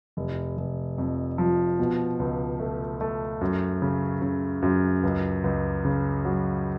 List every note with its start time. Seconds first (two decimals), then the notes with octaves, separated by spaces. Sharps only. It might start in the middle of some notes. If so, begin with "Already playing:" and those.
0.17 F1
0.57 F1
0.98 F2
1.38 F3
1.79 B2
2.20 C#2
2.60 A3
3.01 A3
3.41 F#2
3.82 C#3
4.22 C#3
4.62 F#2
5.03 C#2
5.44 C#2
5.85 C#3
6.25 F#3